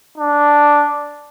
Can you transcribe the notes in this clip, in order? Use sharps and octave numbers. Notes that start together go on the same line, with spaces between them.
D4